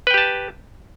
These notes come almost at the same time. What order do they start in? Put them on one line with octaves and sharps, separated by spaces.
B4 G5 G4 A5